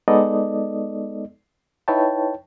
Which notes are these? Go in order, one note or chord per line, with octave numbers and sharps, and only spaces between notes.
G#3 B3 D#4 A4 D5 D#5
D#4 E4 B4 C#5 G5 A5